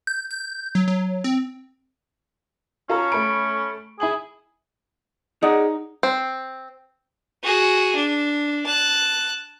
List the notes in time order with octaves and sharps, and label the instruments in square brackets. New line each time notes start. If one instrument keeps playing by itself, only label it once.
[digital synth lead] G6
G6
F#3
F#3
C4
[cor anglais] C#4 [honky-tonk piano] F4 A4 A#5
[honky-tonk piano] A3 B5 D7
[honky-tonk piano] E4 G#5 F#7 [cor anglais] G#4
[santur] D#4 [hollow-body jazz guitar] G#4 D5 F#5
[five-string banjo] C4
[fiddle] F#4 G#4
D4
A5 F#6